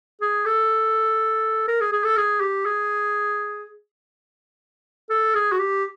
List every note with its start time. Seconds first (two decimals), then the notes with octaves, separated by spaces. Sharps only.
0.21 G#4
0.46 A4
1.68 A#4
1.81 G#4
1.92 G#4
2.04 A4
2.17 G#4
2.41 G4
2.65 G#4
5.10 A4
5.35 G#4
5.52 F#4
5.59 G4